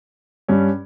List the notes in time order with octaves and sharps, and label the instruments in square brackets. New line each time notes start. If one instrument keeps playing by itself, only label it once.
[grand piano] G2 G3 C#4